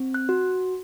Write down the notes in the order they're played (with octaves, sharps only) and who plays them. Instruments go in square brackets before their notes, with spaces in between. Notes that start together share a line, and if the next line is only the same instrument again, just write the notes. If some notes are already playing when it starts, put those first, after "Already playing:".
Already playing: [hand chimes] C4
F#6
F#4